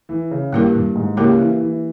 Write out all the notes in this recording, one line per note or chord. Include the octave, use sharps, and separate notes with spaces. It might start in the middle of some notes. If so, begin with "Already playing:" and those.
E3
C#3
G2 A#3 E4 G4 A#4
G2
G#2
C#3 A#3 E4 G4 A#4
E3
E3